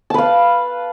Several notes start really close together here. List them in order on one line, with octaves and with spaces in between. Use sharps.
A5 B4 F5